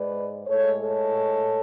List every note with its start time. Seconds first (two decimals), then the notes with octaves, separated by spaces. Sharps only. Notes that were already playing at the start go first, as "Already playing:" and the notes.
Already playing: G#2 G#3 B4 D5
0.47 A2 G#3 A4 C#5
0.81 A4 C#5